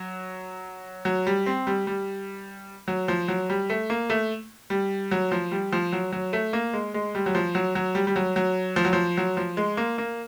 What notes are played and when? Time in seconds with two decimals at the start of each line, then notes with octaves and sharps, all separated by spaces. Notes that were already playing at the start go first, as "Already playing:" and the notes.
Already playing: F#3
1.05 F#3
1.27 G3
1.46 C4
1.67 G3
1.87 G3
2.88 F#3
3.08 F3
3.28 F#3
3.50 G3
3.70 A3
3.90 A#3
4.10 A3
4.70 G3
5.11 F#3
5.32 F3
5.52 G3
5.73 F3
5.93 F#3
6.12 F#3
6.33 A3
6.53 A#3
6.73 G#3
6.94 G#3
7.15 G3
7.26 F#3
7.35 F3
7.55 F#3
7.75 F#3
7.95 G3
8.07 G3
8.16 F#3
8.36 F#3
8.76 F3
8.85 F#3
8.93 F3
9.18 F#3
9.37 F3
9.57 G#3
9.77 A#3
9.98 A#3